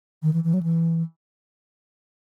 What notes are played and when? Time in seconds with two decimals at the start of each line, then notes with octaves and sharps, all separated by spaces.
0.22 D#3
0.33 E3
0.44 E3
0.53 F#3
0.63 E3